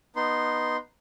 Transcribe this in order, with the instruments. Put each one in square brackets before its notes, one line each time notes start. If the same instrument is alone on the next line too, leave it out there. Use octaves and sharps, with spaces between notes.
[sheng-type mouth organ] B3 D#4 C6